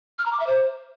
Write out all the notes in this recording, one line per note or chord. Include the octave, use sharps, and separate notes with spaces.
F6
A#5
D6
E5
C5